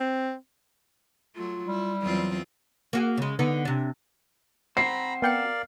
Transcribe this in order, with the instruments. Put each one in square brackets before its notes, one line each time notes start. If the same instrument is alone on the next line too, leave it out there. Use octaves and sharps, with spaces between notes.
[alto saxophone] C4
[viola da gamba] F#3 A3 [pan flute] F4
[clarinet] G3 [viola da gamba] E4
[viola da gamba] E2 C4 F4 [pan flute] F#3
[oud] A#3 F#4 G#4
C#3 G#3
D3 B3 D#4
C3 D4
[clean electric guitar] C4 F#4 C5 [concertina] A#5 B5 [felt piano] C7
[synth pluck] B3 G5 C#7 [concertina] A#4 D5 F5